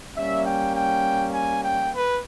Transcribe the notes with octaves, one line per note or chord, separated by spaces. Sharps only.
G3 A#3 C#4 E5
G5
G5
G#5
G5
B4